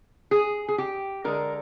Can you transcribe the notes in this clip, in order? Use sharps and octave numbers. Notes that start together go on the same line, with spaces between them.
G#4
G#4
G4
D3 G#3 A#4